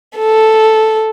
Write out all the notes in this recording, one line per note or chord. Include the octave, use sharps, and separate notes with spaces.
A4